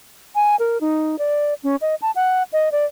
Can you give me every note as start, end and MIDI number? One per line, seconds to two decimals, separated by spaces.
0.35 0.56 80
0.59 0.80 70
0.81 1.19 63
1.19 1.54 74
1.64 1.76 61
1.82 1.95 75
2.02 2.11 81
2.16 2.43 78
2.53 2.72 75
2.72 2.85 74